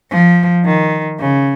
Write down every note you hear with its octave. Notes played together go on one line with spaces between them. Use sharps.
F3
D#3
C#3